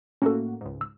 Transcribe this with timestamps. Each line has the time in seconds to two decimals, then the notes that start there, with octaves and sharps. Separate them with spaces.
0.22 A2 A#3 C#4 F#4 A4
0.61 C#2 G#2
0.81 E6